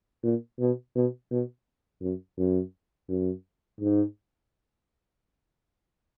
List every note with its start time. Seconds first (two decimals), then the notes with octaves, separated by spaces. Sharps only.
0.23 A#2
0.60 B2
0.95 B2
1.31 B2
2.02 F#2
2.38 F#2
3.09 F#2
3.81 G#2